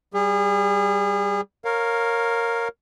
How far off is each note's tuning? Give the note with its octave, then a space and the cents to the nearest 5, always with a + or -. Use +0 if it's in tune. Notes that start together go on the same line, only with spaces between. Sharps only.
G3 -5 G#4 -35
A#4 -5 C#5 -10 F5 +15